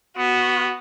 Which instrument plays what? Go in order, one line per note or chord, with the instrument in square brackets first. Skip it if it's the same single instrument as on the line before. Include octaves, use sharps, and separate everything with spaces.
[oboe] B3 [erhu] F#4